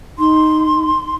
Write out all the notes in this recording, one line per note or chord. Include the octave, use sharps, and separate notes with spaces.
D#4 C6